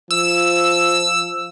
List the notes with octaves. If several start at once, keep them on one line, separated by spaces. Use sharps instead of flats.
F3 E6